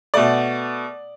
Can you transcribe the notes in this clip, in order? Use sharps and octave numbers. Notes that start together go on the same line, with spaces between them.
B2 A3 D5